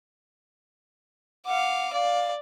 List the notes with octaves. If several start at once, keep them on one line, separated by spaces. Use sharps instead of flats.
F5 F#5 D6
D5 F5